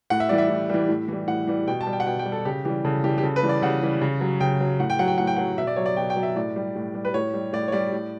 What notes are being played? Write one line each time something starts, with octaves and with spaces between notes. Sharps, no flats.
A2 F#5
E5
E3 G3 D5
E5
A2
E3 G3
A2
E3 G3
A2 F#5
E3 G3
B2 G5
A5
G3
G5
F#5
B2 G5
G5
G3
A4
C#3 G4
E3 G3 G4
C#3 A4
E3 G3 G4
G4
C#3 A4
B4
E3 G3
D5
C#3 F#5
E3 G3
C#3
F#3
C#3 G5
F#3
A2 F#5
G5
F#3 F#5
G5
A2 F#5
G5
F#3 F#5
B2 E5
D5
F#3 C#5
D5
B2 G5
G5
F#3
E5
A2 D5
G3
A2
G3
B4
A2 C#5
G3
A2 D5
C#5
G3 D5
A2